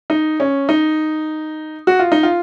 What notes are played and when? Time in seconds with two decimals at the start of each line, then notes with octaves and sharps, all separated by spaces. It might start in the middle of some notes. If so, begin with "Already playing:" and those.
0.10 D#4
0.40 C#4
0.69 D#4
1.87 F#4
1.99 F4
2.12 D#4
2.23 F4